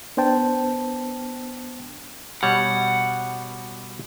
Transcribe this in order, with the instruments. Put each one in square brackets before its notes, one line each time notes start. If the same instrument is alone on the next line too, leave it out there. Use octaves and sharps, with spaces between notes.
[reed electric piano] B3 D4 C5 G5 A5
[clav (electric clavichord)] B2 G3 C#5 [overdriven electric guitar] F#5